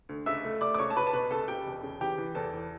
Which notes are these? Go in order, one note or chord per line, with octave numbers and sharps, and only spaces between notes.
D2
C#2 E5 E6
A3
A3 D5 D6
D6
C#2 C#5 C#6
A5
C#2 B4 B5
A5
B2 B4 B5
C#2 A4 A5
C#2 G4 G5
E1
C#3
E3 G4 G5
E3
E2 A4 A5
E3